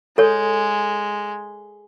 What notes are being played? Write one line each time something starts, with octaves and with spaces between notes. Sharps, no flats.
G#3 A4 C#5